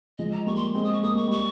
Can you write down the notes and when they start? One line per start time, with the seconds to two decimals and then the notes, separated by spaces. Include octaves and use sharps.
0.19 F3 G#3 D#5
0.32 A#5
0.46 G3 A#3 C#6
0.56 C6
0.75 G#3 C4 C6
0.84 D#6
0.94 C#6
1.03 A#3 D#6
1.15 G#3 C#6
1.28 G3 C#6